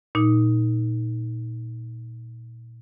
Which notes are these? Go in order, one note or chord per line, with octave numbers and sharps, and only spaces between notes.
A#2 D#4